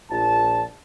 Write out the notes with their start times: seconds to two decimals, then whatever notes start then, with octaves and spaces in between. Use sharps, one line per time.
0.11 A#1 A5